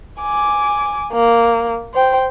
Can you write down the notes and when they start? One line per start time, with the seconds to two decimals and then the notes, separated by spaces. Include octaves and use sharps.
0.21 G#5 D6
1.13 A#3
1.94 C5 G5